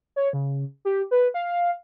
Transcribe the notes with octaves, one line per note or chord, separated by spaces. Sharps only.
C#5
C#3
G4
B4
F5